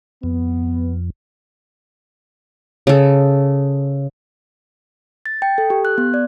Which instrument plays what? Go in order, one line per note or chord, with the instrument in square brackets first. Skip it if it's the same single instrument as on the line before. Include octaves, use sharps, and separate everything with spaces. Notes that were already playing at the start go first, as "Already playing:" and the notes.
[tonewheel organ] F2 [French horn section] B3
[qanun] C#3 A4
[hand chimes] A6
G5
A4
G4
F#6
B3
D5